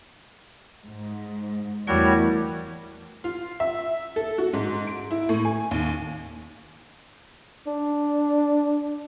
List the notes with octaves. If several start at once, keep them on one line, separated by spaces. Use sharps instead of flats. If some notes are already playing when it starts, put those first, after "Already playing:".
G#2
E2 G3 A3 E4 F#4 A#4 C#5
F4
E5
A4
F#4
G#2
D7
E4
A2
G#5
D#2
D4